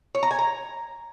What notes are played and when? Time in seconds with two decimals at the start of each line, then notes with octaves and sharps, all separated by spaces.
0.15 C#5
0.23 A#5
0.31 G#5
0.39 A#5